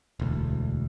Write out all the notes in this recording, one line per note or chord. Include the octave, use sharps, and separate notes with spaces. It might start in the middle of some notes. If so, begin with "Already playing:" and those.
E1 D2